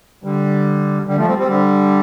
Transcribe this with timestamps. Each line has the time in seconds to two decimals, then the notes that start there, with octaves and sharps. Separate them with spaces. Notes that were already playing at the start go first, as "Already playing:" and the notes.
0.24 D3 G3
1.07 D3 G3
1.17 F3 A3
1.28 G3 C4
1.38 G3 C4
1.48 D3 G3